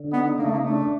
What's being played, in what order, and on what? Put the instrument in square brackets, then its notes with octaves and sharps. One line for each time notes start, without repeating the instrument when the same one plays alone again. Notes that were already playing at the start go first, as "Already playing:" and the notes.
Already playing: [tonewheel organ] D3
[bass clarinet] B3 [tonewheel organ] D#4
[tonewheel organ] C#3 [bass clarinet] A#3
[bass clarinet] A3
A#3
[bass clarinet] A3 [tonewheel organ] D4